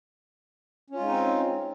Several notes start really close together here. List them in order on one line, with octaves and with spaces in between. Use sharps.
C#4 F4 G#3 D#4 C4